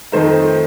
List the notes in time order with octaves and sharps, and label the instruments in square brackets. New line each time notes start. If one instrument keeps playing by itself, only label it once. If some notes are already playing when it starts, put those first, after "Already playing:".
[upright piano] F2 D#3 A3 D#4 C5